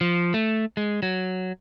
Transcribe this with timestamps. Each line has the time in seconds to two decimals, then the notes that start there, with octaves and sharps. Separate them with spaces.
0.01 F3
0.34 A3
0.77 G#3
1.03 F#3